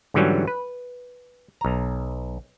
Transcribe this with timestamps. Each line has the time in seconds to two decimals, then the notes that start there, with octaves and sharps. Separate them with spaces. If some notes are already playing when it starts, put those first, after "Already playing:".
0.14 G#2 D3 E3 F#3 G3 C#4
0.48 B4
1.61 B1 A#5